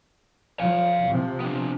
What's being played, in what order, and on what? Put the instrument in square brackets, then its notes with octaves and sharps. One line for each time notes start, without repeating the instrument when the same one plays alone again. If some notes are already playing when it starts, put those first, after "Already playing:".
[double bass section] F3 [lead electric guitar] F5 G#5
[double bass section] C3 F3
[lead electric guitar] B3 D4